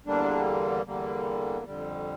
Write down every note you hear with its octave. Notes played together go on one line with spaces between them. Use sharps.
E2 D3 G3 A#3 D4
E2 D3 G3 A#3
F2 D3 G3